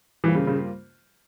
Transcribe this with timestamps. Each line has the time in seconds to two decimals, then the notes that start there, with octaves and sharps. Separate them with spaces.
0.24 G2 E3 G3 A#3 F4 C5
0.35 C#3
0.47 C#3